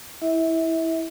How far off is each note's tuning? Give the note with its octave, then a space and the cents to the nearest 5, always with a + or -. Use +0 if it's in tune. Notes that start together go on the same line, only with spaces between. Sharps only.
E4 -10 E5 -30